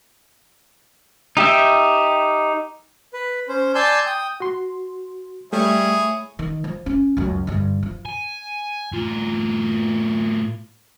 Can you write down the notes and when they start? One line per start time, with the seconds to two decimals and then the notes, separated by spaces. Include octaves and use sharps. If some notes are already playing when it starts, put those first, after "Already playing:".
1.37 D#4 G4 E5 G5
3.13 B4
3.48 C#4 C5
3.75 D5 G#5 A5 C6 E6 G6
4.07 G5 D#6
4.40 F#4 C6
5.53 G3 A3 E4 G#4 C#5
6.39 D#3
6.64 F3
6.86 C#4
7.17 C#2 F#2
7.47 G2 D3
7.83 F3
8.05 G#5
8.93 A2 F4